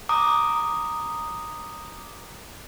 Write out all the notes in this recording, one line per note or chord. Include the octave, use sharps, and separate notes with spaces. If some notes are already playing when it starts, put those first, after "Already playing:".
A#5 D6 D#6